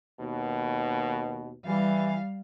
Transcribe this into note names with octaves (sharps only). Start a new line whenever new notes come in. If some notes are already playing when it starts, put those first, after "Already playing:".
D#2 B2
E3 G3 F5